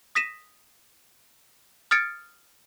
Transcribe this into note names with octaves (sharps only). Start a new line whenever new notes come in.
D#6 A#6 B6 D#7 E7
D#6 F6 G#6 A6 C#7 D7